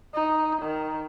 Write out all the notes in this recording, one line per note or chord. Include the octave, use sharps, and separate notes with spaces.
D#4
D#3